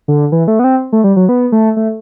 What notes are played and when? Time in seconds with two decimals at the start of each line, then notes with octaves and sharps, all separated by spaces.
0.08 D3
0.32 E3
0.48 A3
0.59 B3
0.64 C4
0.93 A3
1.04 G3
1.16 F#3
1.29 B3
1.52 A3
1.77 A3